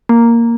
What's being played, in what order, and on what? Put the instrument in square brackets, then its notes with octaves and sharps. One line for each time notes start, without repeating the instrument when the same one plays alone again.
[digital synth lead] A#3